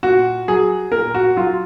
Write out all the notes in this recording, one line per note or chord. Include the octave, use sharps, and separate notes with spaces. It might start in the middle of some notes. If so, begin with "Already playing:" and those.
A#2 F#4
F#3 G#4
A#2 A#4
F#4
F#3 F4